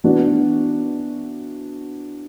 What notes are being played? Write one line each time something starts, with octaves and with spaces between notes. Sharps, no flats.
E3 B3 D4 F#4